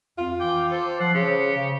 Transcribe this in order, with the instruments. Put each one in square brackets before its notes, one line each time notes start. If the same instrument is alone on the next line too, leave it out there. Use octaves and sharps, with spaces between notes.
[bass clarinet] F2 [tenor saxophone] F4
[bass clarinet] E3 [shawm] G5 [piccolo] D6
[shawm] A4 [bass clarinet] C5
[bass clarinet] F3 [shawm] F#5 [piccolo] C7
[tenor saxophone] C#3 [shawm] G4 [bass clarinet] C5 [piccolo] C#7
[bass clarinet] C#3